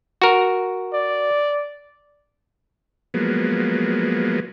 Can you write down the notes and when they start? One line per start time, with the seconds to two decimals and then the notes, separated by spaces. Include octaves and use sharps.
0.22 F#4 A#4
0.93 D5
3.14 F3 F#3 G#3 A#3 B3